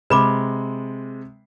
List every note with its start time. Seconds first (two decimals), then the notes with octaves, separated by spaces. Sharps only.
0.10 C3 G#3 B4 B5 D6